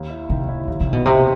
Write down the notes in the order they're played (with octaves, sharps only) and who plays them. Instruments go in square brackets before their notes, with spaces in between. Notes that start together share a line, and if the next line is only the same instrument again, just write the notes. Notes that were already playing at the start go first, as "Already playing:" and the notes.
Already playing: [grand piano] D#2
E4
[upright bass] C3 [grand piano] D#3
[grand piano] E4
[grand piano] D#2 [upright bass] D#3
[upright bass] C3
[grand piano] D#3
[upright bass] B2
[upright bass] C3 [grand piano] D#3